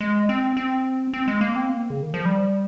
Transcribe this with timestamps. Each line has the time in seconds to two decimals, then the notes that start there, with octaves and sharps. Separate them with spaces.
0.01 G#3
0.29 C4
0.57 C4
1.13 C4
1.28 G#3
1.41 A#3
1.56 C4
1.69 A#3
1.90 C#3
2.02 D#3
2.14 F3
2.25 G3